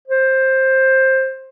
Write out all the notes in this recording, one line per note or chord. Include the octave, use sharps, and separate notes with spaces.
C5